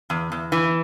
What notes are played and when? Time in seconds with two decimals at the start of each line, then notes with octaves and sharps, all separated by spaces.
0.10 E2
0.32 E2
0.52 E3